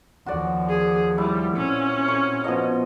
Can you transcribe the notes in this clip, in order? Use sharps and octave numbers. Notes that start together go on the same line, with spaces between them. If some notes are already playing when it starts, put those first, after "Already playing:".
D#2 F3 F#4 D5
G#4
G3 E4
A#2 C4 C#4
C#6
B2 F3 D#5